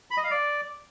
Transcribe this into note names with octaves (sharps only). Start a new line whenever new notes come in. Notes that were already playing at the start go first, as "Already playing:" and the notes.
B5
D#5
F5
D5